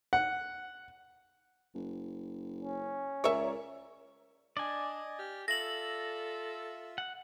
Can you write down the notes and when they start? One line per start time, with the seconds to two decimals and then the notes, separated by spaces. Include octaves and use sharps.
0.13 F#5
1.75 F#1
2.62 C#4
3.24 C#2 A#4 C#5 D5 E5 C#6
4.57 D4 D5 D#5 G#5
5.19 G4 F6
5.48 F4 A4 E5 A#6 F#7
6.98 F#5